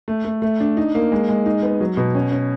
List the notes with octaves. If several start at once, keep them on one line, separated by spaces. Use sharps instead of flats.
A3
A3
A3
D4
D#4
A#3
G#3
G#3
D#4
B3
F#3
B2
C#4
C#4